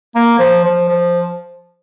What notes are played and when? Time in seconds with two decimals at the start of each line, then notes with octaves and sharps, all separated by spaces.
0.15 A#3
0.39 F3
0.65 F3
0.88 F3